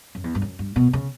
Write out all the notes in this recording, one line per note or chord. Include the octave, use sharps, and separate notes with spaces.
F#2
E2
G2
F#2
G2
B2
C#3